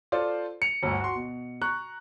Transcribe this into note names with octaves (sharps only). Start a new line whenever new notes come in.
F4 A4 C5 D5
C#7 F7
G1 D2
F#4 C6
B2
A#5 C#6 F#6